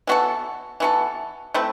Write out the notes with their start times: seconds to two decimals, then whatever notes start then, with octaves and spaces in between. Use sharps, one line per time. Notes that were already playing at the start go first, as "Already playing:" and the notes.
0.07 E3 B3 F#4 A4
0.80 E3 B3 F#4 A4
1.54 A3 C4 E4 B4